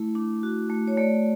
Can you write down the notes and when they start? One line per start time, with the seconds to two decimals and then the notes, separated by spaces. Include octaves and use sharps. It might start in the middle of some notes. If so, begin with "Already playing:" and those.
Already playing: A3 E4
0.15 D4
0.43 F#4
0.70 A3
0.88 C#5
0.97 A3 D5